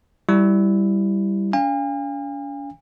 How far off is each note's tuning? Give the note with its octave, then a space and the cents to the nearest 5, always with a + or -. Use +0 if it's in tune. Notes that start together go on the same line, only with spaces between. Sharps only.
G3 +0 E4 +10
C#4 +45 F5 +0 G#5 -45